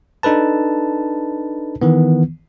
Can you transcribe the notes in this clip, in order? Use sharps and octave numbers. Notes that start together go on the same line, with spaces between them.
D4 D#4 A4 B4 A5
D#3 E3 B3